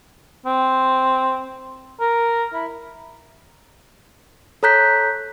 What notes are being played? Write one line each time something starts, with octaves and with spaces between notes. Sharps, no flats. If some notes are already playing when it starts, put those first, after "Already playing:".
C4
A#4
E4
A4 C#5 A#5 F#6 G6 B6